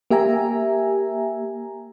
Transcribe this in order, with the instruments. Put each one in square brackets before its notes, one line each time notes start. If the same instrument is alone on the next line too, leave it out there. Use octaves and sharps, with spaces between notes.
[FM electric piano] A#3 G4 E5 G#5 A#5